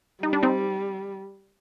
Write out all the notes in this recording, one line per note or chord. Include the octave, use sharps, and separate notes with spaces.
G3 D#4
D4
C4 D#4